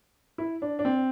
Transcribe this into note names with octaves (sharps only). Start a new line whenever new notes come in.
E4
D4
D4
C4